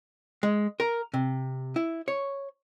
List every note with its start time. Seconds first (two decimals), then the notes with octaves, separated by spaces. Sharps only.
0.43 G#3
0.80 A#4
1.14 C3
1.76 E4
2.08 C#5